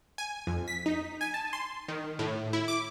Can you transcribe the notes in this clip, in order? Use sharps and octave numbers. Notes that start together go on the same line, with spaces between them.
G#5
F2
B6
D#4
G#5
A5
C6
D#3
A2
E4
D6